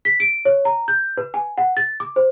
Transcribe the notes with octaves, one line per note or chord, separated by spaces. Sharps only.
B6
D7
C#5
A#5
G6
B4
G#5
F#5
A6
D6
C5